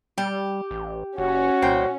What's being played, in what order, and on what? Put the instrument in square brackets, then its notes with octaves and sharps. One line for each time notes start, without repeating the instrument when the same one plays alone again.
[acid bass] G3 [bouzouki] G4
[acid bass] A1
[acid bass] F#1 [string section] C#4 [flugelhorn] F#4
[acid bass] C2 [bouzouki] A#2 C5 G5